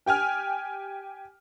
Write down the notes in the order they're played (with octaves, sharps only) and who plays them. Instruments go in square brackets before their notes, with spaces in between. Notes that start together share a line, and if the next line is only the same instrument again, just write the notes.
[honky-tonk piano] G4 G5 G#5 F6